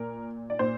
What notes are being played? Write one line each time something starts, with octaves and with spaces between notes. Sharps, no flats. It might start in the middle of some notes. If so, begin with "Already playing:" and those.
Already playing: A#2 A#4
D5
A#2 C5